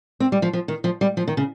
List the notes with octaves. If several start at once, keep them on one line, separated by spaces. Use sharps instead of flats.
C4
G3
F3
F3
D#3
F3
G3
F3
D#3
C#3